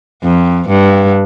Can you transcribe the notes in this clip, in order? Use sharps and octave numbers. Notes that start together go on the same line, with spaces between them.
F2
G2